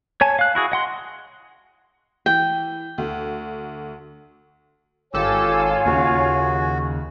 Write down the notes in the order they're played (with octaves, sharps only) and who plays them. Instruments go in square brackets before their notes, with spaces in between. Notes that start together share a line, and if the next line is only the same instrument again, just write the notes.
[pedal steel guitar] C#5 G#5 A5
F5 F#6
E4 F#4 G#4
D#5 F#5 C6
[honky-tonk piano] E3 [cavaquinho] G5
[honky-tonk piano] D2
[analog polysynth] G#1 A4 [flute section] F4 C#5 G#5 [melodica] G4 E6
[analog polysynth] D#2 C#3 [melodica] F#4